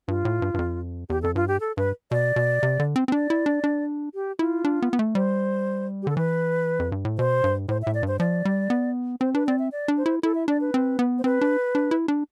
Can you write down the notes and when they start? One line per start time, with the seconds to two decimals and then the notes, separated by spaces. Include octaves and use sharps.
0.08 G2 F4
0.25 A2
0.42 G2
0.54 G2
0.59 F2
1.10 E2 G4
1.22 F2 A4
1.36 G2 F4
1.48 G4
1.60 A4
1.77 G2 B4
2.11 B2 D5
2.36 B2
2.63 C3
2.79 D3
2.96 C4
3.08 C4
3.12 D4 D5
3.30 E4
3.46 D4
3.64 D4
4.14 G4
4.39 E4 F4
4.65 D4
4.82 B3
4.93 B3
4.99 A3
5.15 G3 C5
6.02 G4
6.07 D3 A4
6.17 E3 B4
6.79 F2
6.92 G2
7.05 A2
7.18 B2 C5
7.44 G2
7.69 A2 C5
7.82 E5
7.87 A2
7.94 D5
8.03 G2 C5
8.19 F3 D5
8.45 G3
8.70 B3
9.21 C4 C5
9.35 D4 B4
9.47 C4 D5
9.59 E5
9.72 D5
9.88 D4
9.98 C5
10.06 E4
10.23 E4 A4
10.35 E5
10.48 D4 D5
10.61 B4
10.74 C4
10.99 B3
11.18 C5
11.24 C4 B4
11.41 D4
11.75 D4
11.91 E4
12.08 D4